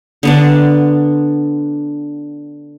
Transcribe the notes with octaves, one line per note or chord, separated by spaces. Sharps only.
D3 B3 D4